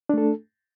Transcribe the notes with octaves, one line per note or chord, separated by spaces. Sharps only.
A3 D4 A4